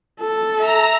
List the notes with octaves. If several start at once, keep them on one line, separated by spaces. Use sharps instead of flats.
A4
E5 A#5